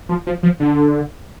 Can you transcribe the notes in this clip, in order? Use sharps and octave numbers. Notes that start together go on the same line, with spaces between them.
F3
F3
F3
D3